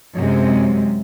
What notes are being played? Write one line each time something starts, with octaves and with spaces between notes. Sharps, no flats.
F#2 C3 G#3